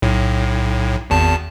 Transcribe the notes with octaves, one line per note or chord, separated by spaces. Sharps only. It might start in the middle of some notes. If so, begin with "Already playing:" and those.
B1 A2
G#1 E2 A5